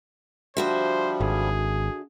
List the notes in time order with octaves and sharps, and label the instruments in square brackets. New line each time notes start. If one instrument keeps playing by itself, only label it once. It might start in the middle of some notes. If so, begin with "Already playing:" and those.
[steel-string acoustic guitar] D3 F#4 E5 [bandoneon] F3 G3 [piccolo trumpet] C5
[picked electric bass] G#1 [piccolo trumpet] G#4